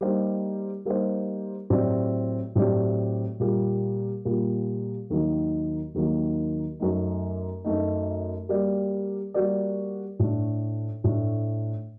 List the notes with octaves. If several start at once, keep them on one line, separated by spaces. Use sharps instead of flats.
G3 A#3 D#4 G4 C5
G3 A#3 D#4 G4 C5
A2 F#3 C4 G4 D5
A2 F#3 C4 G4 D5
A#2 G3 A#3
A#2 G3 A#3
D#2 D#3 F#3 A#3
D#2 D#3 F#3 A#3
F#2 F#3 A3 D#4
F#2 F#3 A3 D#4
G3 A#3 F#4 A#4 D5
G3 A#3 F#4 A#4 D5
A2 A3 D4
A2 A3 D4